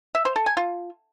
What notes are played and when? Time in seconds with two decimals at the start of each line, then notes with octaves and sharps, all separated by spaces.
0.15 E5
0.25 C5
0.36 A4
0.46 G#5
0.57 F4